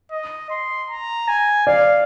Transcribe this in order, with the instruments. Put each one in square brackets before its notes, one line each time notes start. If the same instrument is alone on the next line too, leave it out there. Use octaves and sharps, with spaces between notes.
[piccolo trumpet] D#5
C6
A#5
G#5
[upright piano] D5 [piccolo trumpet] F5